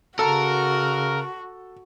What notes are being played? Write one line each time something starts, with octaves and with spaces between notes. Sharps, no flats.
C#3 F#4 A4 A#4